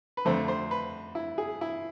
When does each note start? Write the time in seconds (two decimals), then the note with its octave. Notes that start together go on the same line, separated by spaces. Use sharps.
0.17 B4
0.25 F2 D3 A3 C4 C5
0.48 C5
0.71 B4
1.15 E4
1.38 G#4
1.61 E4